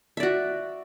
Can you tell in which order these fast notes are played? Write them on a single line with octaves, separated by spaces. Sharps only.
E5 D5 F#4